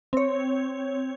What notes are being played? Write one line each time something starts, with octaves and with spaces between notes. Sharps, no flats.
C4 C#5